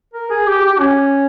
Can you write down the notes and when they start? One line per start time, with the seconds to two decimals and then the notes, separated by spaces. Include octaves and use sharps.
0.14 A#4
0.30 G#4
0.47 G4
0.63 G4
0.79 C#4